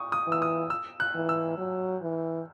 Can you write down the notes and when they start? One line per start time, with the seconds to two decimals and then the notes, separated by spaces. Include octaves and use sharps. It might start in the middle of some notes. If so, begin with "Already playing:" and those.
Already playing: C#6 D#6
0.12 D#6
0.27 E3
0.32 E6
0.42 D#6
0.70 E6
1.00 F#6
1.15 E3
1.29 E6
1.57 F#3
2.02 E3